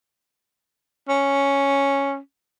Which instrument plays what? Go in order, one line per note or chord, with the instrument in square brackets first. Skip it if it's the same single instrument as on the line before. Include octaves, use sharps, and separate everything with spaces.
[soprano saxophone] C#4